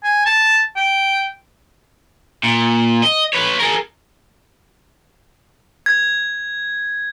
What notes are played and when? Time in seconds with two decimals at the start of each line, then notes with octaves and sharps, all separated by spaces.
0.04 G#5
0.26 A5
0.76 G5
2.44 A#2
3.03 D#5
3.33 B4 C#5
3.60 G#4 A#4
5.86 G#6